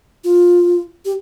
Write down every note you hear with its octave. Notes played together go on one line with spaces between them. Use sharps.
F4
G4